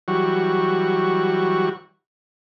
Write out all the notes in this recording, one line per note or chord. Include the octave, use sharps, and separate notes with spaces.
E3 F#3 G3 F#4 C#6